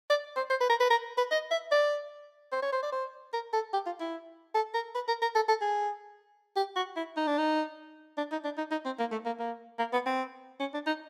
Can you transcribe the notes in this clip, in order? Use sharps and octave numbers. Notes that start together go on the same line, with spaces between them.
D5
C5
C5
B4
A#4
B4
A#4
B4
D#5
E5
D5
C5
C#5
C5
D5
C5
A#4
A4
G4
F4
E4
A4
A#4
B4
A#4
A#4
A4
A4
G#4
G4
F#4
E4
D#4
D4
D#4
D4
D#4
D4
D#4
D#4
C4
A#3
A3
A#3
A#3
A#3
B3
C4
C#4
D4
D#4